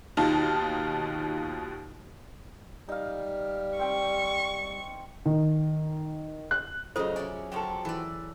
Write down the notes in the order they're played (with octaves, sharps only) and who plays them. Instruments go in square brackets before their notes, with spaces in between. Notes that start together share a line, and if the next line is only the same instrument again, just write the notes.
[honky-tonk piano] D#2 B2 D#4 F4 A5
[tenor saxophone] G3 [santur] D#4 F5
[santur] C4 G5 [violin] C#6
[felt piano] D#3
F#6
[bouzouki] A2 D#4 [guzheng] C#3 F#3 [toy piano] F4 A4 C5
[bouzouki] C#4 D#4 E4 [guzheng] D5 [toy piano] G#5
[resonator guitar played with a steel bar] F#2 A4 [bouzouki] F3 F#4 G4
[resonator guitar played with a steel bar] E3 [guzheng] A4 D5